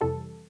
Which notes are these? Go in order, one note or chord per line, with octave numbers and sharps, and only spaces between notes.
F2 C3 E3 G3 A4